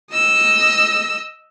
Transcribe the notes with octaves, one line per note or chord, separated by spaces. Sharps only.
D#5 E6